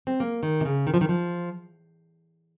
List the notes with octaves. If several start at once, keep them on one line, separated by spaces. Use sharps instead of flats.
C4
A#3
D#3
C3
C#3
D#3
F3
D#3
F3